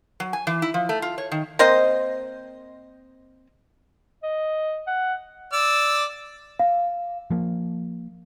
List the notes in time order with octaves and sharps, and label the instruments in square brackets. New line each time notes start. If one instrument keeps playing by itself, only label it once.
[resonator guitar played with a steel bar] F#3
G#5
E3
E4
F3
A3
F4
C#5
D#3
[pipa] A#3 C4 C5 D#5
[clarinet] D#5
F#5
[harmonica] D5 E6
[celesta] F5
[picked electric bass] F3 A#3